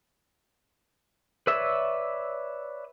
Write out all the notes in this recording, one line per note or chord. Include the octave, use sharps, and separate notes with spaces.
B4 C#5 D5 E5 E6